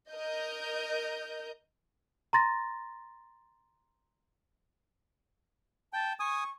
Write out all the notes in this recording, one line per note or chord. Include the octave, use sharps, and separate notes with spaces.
A#4 D#5 G6
A#5 C6 A6 A#6
G5 A5
G#5 C#6 D#6